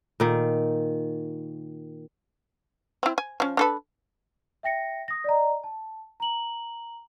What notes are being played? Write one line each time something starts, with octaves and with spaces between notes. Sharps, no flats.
A#2 D#3
C4 E4
G#5
F3 C#4
D4 A4 B4
E5 G5 A#6 C#7
D#6 A#6
D5 D#5 A#5
A5
A#5 F#7